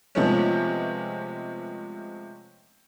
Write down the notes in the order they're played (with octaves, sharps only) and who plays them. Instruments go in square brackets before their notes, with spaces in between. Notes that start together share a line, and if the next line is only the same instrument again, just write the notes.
[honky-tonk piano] C3 F3 G#3 A3 B3 C#4